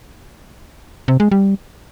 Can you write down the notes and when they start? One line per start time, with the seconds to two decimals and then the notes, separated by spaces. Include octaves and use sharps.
1.08 C3
1.20 G#3
1.31 G3